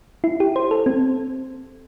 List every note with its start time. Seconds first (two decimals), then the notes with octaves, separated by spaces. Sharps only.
0.24 E4
0.40 G4
0.56 C5
0.71 A4
0.86 C4